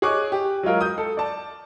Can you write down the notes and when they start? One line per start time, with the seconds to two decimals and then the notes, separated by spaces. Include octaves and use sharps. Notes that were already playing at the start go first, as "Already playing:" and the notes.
0.02 G#4 C#5 D#5 C#6 D6 F#6
0.32 G4
0.63 F#3 G#3 F4 A#4
0.81 D#6 G6
0.98 A4
1.17 D5 A5